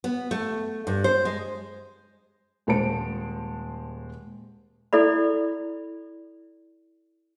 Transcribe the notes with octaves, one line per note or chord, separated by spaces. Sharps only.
B3
A3
G2
C5
G#3
D#1 G#3 C5 A5 D7
E4 A4 D5 B5